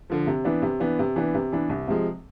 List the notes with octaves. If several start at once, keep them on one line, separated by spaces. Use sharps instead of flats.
D3 F3
C3
E3 B3 D4
C3
E3 B3 D4
C3
E3 B3 D4
C3
E3 B3 D4
C2
C3 F3 G#3